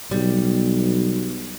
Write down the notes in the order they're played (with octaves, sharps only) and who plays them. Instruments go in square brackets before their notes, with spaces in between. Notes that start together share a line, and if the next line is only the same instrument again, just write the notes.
[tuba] B1 [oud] G3